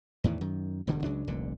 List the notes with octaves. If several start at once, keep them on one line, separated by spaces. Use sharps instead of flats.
E2 A2 D#3 E3
F#2 D#3
E1 D2 G2 D3
C#2 C#3 F#3 D4
F1 C2 A#2 D3